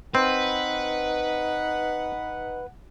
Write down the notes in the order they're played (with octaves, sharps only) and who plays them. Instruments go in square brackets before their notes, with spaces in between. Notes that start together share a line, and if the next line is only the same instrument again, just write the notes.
[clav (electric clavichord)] C4 [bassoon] D#4 [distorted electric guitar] B4 [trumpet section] F#5